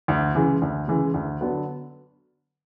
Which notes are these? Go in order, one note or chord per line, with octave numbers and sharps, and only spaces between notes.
D2
C#3 E3 G#3
D2
C#3 E3 G#3
D2
D3 F#3 B3